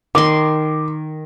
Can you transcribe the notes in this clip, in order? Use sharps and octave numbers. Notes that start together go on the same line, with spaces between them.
D#3 C6 D6